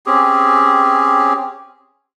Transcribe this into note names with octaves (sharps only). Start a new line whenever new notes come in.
C4 C#4 G4 G#4